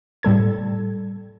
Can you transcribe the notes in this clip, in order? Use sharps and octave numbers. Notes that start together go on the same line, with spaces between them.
A2 G3 A4 G#6